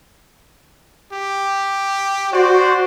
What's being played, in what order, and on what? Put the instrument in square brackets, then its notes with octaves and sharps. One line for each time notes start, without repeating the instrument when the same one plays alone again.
[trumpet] G4
[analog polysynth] F#4 [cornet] C5 [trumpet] D5